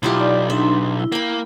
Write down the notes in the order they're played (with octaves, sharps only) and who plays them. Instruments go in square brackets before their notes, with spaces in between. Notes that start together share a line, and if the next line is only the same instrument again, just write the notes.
[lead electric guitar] B1 [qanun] E4 F4 G4
[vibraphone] D#4 D5
[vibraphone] D4 D#4 C6 [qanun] E5
[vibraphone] E4
[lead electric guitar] A#3 [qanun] G5 B5